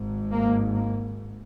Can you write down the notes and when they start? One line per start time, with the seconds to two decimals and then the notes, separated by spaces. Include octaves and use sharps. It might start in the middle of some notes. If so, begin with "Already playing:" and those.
Already playing: G#1 G#2
0.33 A#3
0.75 A#3